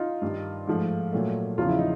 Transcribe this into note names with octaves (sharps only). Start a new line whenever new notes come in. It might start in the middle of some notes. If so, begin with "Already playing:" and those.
Already playing: D#4 F4
G2 D#3 G3
G#2 F3 A3
A#2 F#3 A3
E2 C#3 F3 F4
E4
D#4